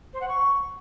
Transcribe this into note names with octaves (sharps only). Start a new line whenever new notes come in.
C5
F#5
C#6